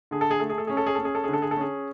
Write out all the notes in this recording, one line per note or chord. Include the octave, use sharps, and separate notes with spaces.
D3 G#4
A4
G#4
A3 A4
G#4
A4
C#4 G#4
A4
G#4
C#4 A4
G#4
A4
G#4
D3
A4
G#4
A4
C#4 G#4